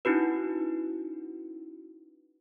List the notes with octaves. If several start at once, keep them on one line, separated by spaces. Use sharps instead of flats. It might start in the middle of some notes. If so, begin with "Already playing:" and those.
C#4 D#4 E4 F#4 B4